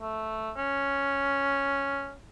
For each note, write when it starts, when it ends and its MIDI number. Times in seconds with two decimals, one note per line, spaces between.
0.01 0.51 57
0.56 2.13 61